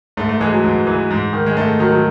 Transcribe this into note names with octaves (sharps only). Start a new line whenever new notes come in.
G#2 A3
A3
E3 G#3
F#3
G#2
E3
G#2
D#3
G#3
G#2 A3
D#3 F#3
F#3